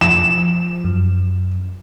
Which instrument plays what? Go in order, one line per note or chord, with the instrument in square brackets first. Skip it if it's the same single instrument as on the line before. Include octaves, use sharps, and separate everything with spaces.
[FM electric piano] F3 [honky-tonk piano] E7
[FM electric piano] F#2